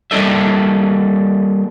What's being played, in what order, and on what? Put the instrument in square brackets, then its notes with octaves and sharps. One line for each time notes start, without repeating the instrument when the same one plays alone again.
[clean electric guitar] G3 A#3 D4 A4 D#5 E5